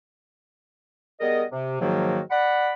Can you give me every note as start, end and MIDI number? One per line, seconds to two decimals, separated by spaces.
1.20 1.44 55
1.20 1.44 59
1.20 1.44 68
1.20 1.44 70
1.20 1.44 75
1.51 1.76 48
1.80 2.20 44
1.80 2.20 51
1.80 2.20 53
1.80 2.20 54
1.80 2.20 58
1.80 2.20 66
2.30 2.73 74
2.30 2.73 78
2.30 2.73 83